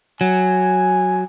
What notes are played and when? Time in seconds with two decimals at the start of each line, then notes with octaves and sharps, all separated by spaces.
0.21 F#3 G#5